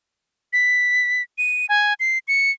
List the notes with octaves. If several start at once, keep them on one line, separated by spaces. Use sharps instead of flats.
B6
D#7
G#5
C7
C#7